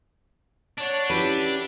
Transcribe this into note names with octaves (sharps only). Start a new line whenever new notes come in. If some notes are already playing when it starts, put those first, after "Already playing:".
D4 C#5 F#5
C#4 E4 G4 B4